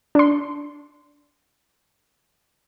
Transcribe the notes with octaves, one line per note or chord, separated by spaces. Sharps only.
D4 C6